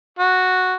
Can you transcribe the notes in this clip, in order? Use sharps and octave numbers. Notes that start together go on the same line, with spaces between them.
F#4